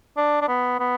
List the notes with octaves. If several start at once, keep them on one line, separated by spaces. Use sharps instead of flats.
D4
D4
B3
B3